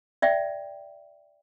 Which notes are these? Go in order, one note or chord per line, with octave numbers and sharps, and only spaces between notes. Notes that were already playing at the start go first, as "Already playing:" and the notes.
D5 E5 G5